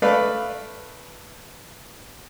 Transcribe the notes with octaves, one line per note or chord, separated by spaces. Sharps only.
A3 B4 D5 F5